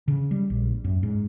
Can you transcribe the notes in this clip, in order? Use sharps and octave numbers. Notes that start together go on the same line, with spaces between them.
C#3
G3
A#1
F#2
G#2